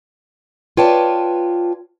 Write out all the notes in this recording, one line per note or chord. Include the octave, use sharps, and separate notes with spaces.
F4 B4 C#5 D5 G5 A5